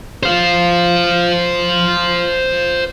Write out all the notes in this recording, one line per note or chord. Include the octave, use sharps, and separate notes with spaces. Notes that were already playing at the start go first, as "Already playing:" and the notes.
C5 F5